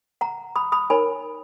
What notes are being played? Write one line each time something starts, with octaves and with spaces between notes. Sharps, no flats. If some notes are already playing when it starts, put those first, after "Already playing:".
F#5 A#5
B5 D#6
B5 D#6
D#4 A#4 C#5 G#5 B5